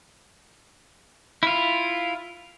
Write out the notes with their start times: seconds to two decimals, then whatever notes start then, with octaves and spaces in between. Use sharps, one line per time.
1.43 E4 F4